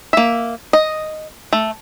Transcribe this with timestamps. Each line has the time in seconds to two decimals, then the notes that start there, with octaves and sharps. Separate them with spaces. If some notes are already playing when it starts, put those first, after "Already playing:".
0.13 A#3 E5
0.73 D#5
1.53 A3